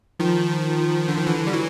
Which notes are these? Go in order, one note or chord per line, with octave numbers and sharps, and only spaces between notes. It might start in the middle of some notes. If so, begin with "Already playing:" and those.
D#3 F3
D3
D#3
D3 E3
G3
E3 F#3